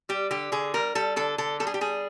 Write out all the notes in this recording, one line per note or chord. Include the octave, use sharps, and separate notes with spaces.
G3 G4
D3 G4
D3 G#4
G3 A#4
G3 A4
D3 A4
D3 A4
G3 A4
G#4
G4
G3 G#4